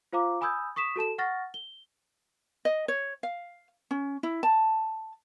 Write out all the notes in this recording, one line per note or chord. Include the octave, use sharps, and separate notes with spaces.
F4 C5 F5 A#5 D6
G#5 B5 D#6 E6 G6 G#6
C#6 D#6 B6 E7
F#4 A4 A5 E7
F#5 C#6 F6 A6 A#6
G7
D#5
C#5
F5
C#4
E4
A5